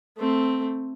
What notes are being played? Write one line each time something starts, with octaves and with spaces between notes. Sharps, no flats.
A3 C4